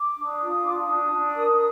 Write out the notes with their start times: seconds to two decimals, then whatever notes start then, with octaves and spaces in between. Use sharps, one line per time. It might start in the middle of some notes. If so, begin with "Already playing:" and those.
Already playing: D6
0.17 D4
0.24 D#6
0.40 F4
0.56 D#6
0.63 D4 D6
0.77 D#6
0.86 D4
1.11 D4
1.35 A#4